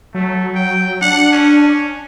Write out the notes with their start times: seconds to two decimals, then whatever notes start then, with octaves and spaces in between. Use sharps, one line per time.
0.14 F#3 A3
0.55 G5
1.01 D4 F#5
1.32 C#4